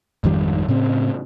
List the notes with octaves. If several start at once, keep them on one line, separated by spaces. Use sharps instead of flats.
G#1 F2 D#3 G3
A2 C#3 C4